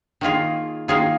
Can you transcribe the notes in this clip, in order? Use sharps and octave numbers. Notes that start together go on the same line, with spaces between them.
D#3 A#3 F4 G#4
D#3 A#3 F4 G#4